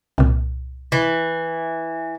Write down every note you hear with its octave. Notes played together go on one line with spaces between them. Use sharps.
C2 A#2
E3